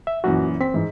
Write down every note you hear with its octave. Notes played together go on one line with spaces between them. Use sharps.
E5
F#2 A#2 E3 F#4
C4 B6
G#2 E3